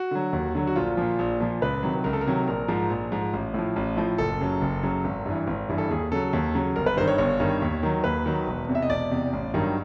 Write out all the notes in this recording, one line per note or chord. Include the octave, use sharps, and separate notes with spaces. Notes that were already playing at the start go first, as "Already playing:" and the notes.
Already playing: F#4
D3 F#3
D#2
D3 F#3
F#4
A#1 F4
A#2 F3
A#1
A#2 F3
C#2 B4
C3 D#3 F#3
C#2 A#4
A4
A#4
C3 D#3 F#3
A#1 A#4
G#2 F3
A#1
G#2 F3
A1
A2 F3
A1
A2 F3
F#1 A4
F#2 C#3 F#3
F#1
F#2 C#3 F#3
G#1
G2 E3
G#1
G2 E3
A4
D#2 G#4
C#3 F#3 A4
D#2
C#3 F#3
G1 A#4
B4
G2 D#3 C5
C#5
G1 C#5
G2 D#3
D#2
D#3 F#3
D#2 B4
D#3 F#3
E1
E2 C3
E5
D#5
E1 D5
E2 C3
A1
G2 D#3 F#3